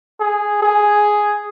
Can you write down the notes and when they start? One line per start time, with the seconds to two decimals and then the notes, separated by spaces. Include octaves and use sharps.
0.20 G#4
0.62 G#4